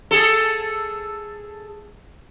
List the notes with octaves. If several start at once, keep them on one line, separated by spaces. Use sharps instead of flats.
G#4 A4